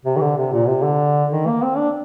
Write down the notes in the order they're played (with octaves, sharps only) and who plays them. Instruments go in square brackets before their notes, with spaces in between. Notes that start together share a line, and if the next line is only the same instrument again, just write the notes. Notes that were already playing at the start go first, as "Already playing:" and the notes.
[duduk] C3
D#3
D3
C3
A#2
C3
D3
D#3
A#3
C4
D4